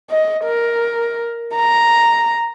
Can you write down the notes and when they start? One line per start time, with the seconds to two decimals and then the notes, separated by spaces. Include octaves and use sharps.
0.10 D#5
0.44 A#4
1.55 A#5